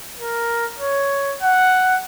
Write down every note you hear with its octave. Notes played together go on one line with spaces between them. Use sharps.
A#4
C#5
F#5